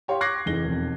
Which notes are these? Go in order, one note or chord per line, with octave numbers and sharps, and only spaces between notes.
G4 C#5 F5 C6
C#6 D6 F#6 G#6 A#6 C7
F1 E3 D#4 G#4 A#6 G7
E1 F2